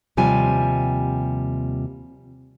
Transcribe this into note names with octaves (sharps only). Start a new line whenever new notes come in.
D#2 C3 F3 G3 G#5